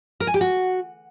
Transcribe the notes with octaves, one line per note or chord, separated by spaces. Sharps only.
A#4
G#5
G4
F#4